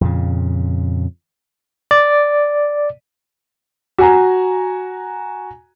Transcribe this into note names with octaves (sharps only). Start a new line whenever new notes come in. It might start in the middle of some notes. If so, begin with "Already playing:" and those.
F2 A#2 C#3
D5
F#4 G#5 A#5